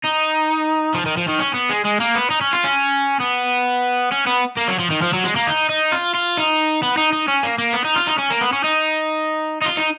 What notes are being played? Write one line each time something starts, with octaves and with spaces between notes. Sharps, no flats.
D#4
F3
D#3
F3
D#3
C#4
B3
G#3
G#3
A#3
B3
D#4
C#4
F4
C#4
B3
C#4
B3
A#3
F#3
F3
D#3
F3
F#3
G#3
A#3
D#4
D#4
F4
F4
D#4
B3
D#4
D#4
C#4
A#3
A#3
B3
D#4
F4
D#4
C#4
A#3
B3
C#4
D#4
D#4
F4
D#4